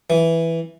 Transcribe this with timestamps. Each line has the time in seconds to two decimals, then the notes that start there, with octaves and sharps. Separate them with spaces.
0.10 E3